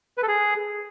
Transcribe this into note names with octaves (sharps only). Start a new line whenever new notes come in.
B4
A4
G#4